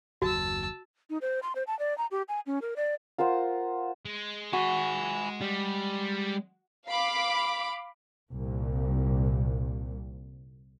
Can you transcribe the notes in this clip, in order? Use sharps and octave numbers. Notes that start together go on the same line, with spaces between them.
F#1 D#2 F#4 A5 E6
D#4
C5
C6
C5
A5
D5
A#5
G4
G#5
C#4
A#4
D5
F4 A#4 C5 F#5
G#3
F#4 G#5 B5
G3
F5 B5 D6
C2 A#2